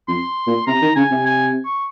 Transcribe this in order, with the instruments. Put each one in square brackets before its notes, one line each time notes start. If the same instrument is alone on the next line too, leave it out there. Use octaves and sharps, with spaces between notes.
[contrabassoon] F2 [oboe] C6
[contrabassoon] A#2
[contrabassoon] C3 [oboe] A#5
[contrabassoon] D#3
[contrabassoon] C#3 [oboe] G#5
[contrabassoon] C3
[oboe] G#5
C#6